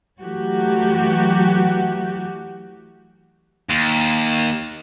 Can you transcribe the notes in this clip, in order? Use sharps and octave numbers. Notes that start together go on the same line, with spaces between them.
E3 F#3 A3 F#4 G4
D#2